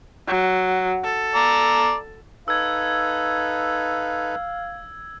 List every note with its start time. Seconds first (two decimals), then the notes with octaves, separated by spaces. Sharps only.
0.27 F#3
1.04 A4
1.35 D5 A#5
2.48 D#4 A4 B4 F5 E6 G#6